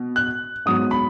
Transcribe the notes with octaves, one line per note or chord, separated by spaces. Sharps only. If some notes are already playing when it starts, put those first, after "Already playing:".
Already playing: B2
F#6
G#2 F#3 B3 D#6
B5